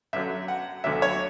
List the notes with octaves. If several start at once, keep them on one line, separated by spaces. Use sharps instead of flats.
F#2 D3 F#3 E5
F#5
D2 D3 F#3 E5
C#5